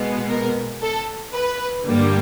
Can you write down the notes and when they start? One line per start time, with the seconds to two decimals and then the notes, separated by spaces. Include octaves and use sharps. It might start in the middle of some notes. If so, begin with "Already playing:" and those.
Already playing: B2 G#3 B3
0.29 A#4
0.82 A4
1.34 B4
1.87 G2 D3 G3 A#3